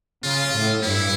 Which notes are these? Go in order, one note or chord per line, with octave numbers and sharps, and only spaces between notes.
C#3 F4
A2
G2 E4